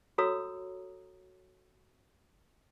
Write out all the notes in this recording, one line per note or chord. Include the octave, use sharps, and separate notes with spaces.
F#4 A4 C#5 A#5 D#6 E6